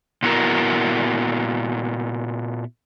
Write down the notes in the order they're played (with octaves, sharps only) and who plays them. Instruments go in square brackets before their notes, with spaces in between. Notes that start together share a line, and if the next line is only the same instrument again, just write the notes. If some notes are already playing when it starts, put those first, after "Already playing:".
[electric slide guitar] A#2 B3 E4 F#4 A#4